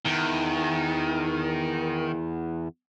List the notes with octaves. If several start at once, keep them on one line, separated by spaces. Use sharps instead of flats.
E2 D#3